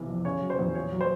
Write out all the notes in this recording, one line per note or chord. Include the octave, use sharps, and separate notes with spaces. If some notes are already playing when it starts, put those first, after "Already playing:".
Already playing: B1 C3 E3
F2
C#3 C#5
F#3
C5
E2
A#2 C#5
F#3
C5